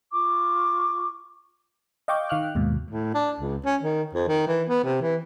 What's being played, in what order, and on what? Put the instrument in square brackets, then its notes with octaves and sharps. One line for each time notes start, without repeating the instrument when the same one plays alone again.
[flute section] F4 C#6 D6
[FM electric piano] D#5 F5 G5 C#6 D6 G6
D#3 F5 F6 F#6
D#2 G#2 B2
[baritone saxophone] A2
D4
C#2
C#4
D#3
F2
D#3
E3
B3
C3
E3